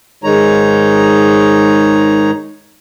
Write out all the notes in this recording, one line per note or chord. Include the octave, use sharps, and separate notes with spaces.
G#2 D#3 G#3 D#4 C#5 A#5